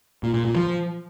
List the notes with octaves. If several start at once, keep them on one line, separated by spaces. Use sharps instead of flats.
A#2
A#2
A#2
F3